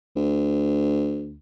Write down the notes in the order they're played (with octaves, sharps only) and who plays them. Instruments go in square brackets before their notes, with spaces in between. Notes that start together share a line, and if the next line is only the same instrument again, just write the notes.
[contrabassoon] D2